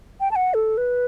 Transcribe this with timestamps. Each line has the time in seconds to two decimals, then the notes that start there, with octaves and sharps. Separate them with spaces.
0.20 G5
0.31 A5
0.36 F#5
0.54 A4
0.77 B4